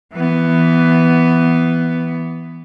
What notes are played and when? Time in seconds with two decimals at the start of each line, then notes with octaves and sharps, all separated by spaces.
0.14 E3 B3